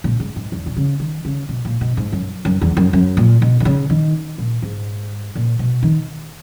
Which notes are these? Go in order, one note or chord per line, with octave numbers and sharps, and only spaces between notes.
A#2
G#2
G#2
E2
B2
C#3
D#3
C#3
B2
A#2
B2
G#2
F#2
F#2
E2
F#2
F#2
A#2
B2
D#3
C#3
D#3
A#2
G#2
A#2
B2
D#3